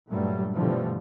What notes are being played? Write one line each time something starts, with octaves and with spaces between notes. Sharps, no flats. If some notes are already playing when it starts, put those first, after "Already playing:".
G2 A#2 F#3 G3 A3
B2 D3 E3 F3 G3 A3